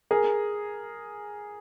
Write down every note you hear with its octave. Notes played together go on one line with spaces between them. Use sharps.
G#4 A#4